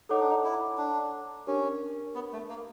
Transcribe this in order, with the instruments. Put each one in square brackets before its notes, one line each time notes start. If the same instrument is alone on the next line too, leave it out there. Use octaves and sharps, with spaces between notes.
[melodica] D#4 [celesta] A4 C#5 F#5 A#5 D6
[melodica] D4
D#4
E4
D4
[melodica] C#4 [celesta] D4 G4 A#4 C#5
[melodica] B3
A3
A#3